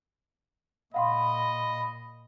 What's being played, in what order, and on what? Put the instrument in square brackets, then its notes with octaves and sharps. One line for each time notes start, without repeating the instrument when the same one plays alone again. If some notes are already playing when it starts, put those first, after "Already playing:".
[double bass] A#2 [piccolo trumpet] D#5 [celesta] F5 F#5 C6 [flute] B5